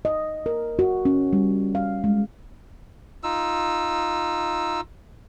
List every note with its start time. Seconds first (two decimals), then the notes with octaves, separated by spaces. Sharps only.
0.05 D#5
0.46 A#4
0.79 F#4
1.05 C#4
1.33 G3
1.75 F5
2.04 G#3
3.23 D#4 F4 E6